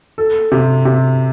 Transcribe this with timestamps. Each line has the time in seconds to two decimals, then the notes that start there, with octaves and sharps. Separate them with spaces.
0.18 A4
0.52 C3
0.85 C3